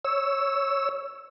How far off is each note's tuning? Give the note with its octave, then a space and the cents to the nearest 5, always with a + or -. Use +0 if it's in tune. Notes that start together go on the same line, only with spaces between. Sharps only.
C#5 +0 E6 +0